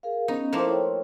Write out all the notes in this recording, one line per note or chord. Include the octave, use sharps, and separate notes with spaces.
G#4 A#4 F5
B3 C#4 D#4 D#5
F3 A3 A#3 E4 F5 D6
A4 C#5 G5